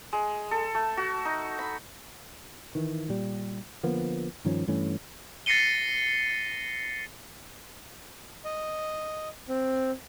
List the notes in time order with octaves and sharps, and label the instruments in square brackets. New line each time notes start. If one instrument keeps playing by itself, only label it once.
[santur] G#3
A4
A3
F#4
D#4
B5
[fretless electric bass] D#3 E3
A#2 G3
D3 F3 A#3 B3
G2 D#3 F3 C#4
G2 E3 A3 C#4
[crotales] A6 A#6 C7 C#7 D#7 G7
[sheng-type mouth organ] D#5
C4